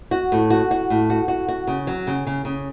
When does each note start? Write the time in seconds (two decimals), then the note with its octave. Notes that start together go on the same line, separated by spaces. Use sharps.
0.11 F#4
0.32 A2
0.50 F#4
0.71 F#4
0.90 A2
1.10 F#4
1.28 F#4
1.48 F#4
1.67 C#3
1.87 F#3
2.07 C#3
2.27 C#3
2.45 C#3